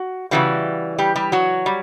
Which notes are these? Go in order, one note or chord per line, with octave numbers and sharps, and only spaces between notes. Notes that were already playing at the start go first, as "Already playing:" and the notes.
Already playing: F#4
C#3 E3 G3 F#4
G3 G4
G3 G4
F#3 F#4
G3